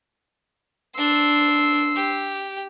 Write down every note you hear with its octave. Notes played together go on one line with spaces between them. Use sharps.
D4 C6 E6
G4